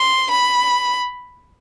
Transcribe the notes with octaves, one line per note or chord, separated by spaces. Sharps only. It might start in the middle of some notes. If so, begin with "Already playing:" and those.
Already playing: C6
B5